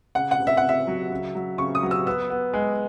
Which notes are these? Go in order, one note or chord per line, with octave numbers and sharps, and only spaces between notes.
C#3 F#5
F#5
C#3
E5
F#5
C#3
E5
F#3
C#3
F#3
C#3 C#6
D#6
F#3
E6
B3 E6
B3
G#3